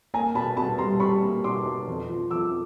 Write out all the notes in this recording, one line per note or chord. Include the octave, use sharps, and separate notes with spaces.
A#3 G#5 A#5
B2 A5 B5
B2 A5 B5
G3 A#5 C6
G3 B5 C#6
A#3
B2 C6 D6
B2
F2
F3
F3 D6 E6